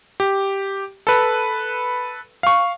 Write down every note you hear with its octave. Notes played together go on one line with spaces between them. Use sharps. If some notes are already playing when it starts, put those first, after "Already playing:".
G4
A4 B4
F5 C#6